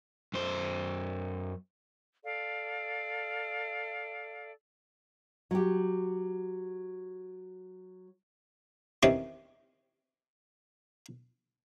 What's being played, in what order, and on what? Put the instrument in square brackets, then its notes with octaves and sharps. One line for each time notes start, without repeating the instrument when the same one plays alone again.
[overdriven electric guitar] F#2 C5
[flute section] A4 D5 F5
[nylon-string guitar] F#3 G4
[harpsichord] D#3 E3 C4 C#4 G4